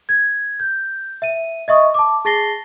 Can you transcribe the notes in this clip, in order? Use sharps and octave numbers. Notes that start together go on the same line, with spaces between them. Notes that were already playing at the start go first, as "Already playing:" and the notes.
G#6
G6
E5 D#7
D#5 E5 C#6 D#6
A5 D6
G#4 A5 A6 A#6 C7 G7